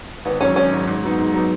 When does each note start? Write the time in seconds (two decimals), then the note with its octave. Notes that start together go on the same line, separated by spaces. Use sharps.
0.25 G#1 B3
0.41 G#2 F#3 C#4
0.56 G#1 C#4
0.72 G#2 F#3
0.87 G#2
1.03 F#3 B3 D#4
1.19 G#2
1.34 F#3 B3 D#4